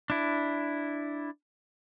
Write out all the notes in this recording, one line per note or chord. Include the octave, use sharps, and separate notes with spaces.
D4 E4